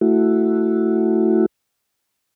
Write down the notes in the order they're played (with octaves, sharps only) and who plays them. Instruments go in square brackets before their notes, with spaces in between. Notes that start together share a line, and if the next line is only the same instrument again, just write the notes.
[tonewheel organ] A3 E4 F#4